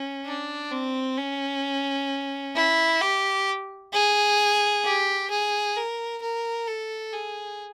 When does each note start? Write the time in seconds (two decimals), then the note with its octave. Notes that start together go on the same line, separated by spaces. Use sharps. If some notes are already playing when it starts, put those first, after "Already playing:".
Already playing: C#4
0.26 D4
0.72 C4
1.18 C#4
2.56 E4
3.01 G4
3.93 G#4
4.85 G4
5.30 G#4
5.76 A#4
6.22 A#4
6.68 A4
7.13 G#4